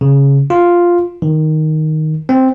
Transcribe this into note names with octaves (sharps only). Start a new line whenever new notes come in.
C#3
F4
D#3
C4